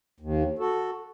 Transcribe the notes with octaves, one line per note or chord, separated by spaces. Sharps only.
D#2
F#4 A4